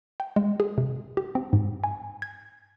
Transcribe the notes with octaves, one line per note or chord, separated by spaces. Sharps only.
G5
G#3
G#4
C3
G4
C4
G#2
G#5
G#6